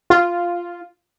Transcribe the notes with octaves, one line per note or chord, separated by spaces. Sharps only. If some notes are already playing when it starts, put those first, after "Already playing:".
F4